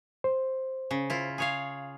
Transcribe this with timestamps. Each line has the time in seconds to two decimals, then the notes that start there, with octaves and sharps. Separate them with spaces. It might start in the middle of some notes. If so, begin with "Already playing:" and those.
0.24 C5
0.91 C#3
1.10 E4 F4
1.38 G#4 C#5 F5